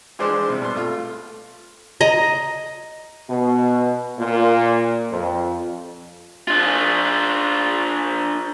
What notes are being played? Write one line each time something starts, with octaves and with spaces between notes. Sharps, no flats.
E3 F3 G#3 D4 C5 D5
C3 G3
B2 C6
A3 F4
D#5 A#5
B2
A#2
F2
D4 F4